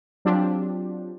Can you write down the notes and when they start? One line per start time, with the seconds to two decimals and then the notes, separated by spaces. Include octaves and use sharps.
0.25 F#3 C4 D4 F4 G4